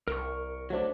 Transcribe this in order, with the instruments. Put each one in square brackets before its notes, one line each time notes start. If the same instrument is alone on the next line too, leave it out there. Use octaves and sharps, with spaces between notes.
[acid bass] C2 [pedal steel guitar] A#4 C#6
[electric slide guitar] F#3 A3 D4 [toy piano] F#4 C5